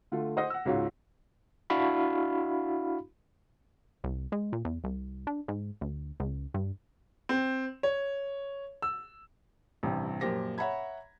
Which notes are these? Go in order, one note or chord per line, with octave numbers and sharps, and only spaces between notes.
D3 A3 F4
C5 D#5 F#5 D#6 A#6
F#5 E6
C#2 G#2 C#4 F4 F#4
D4 E4 F#4 F5 B5
C2
G#3
A#2
E2
C2
D4
G#2
D2
C#2
G2
C4
C#5
E6
A1 G2 C3
F#2 A#2 F3 G4 C5 A#6
C#5 E5 F#5 A#5 B5 G#6